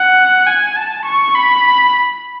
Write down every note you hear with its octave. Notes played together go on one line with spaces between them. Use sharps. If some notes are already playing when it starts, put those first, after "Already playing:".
Already playing: F#5
G#5
A5
C#6
B5